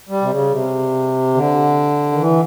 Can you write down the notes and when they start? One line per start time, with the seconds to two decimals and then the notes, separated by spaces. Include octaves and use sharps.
0.09 G3
0.22 C3
0.30 C#3
0.51 C3
1.34 D3
2.12 D#3
2.19 E3